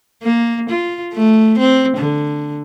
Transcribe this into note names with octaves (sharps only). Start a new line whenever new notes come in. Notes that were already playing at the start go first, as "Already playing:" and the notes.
A#3
F4
A3
C4
D3